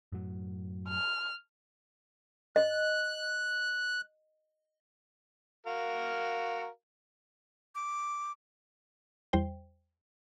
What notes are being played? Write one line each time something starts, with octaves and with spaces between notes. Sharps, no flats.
F#2 A2 F#3
F6
D#5 F#6
F#4 A#4 F5
D6
E2 G3 C5 G5